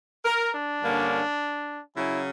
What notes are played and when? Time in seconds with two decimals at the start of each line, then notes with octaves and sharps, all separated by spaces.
0.25 A#4
0.53 D4
0.82 G2 D3 A#3 C#4
1.95 C#3 F#3 C#4 E4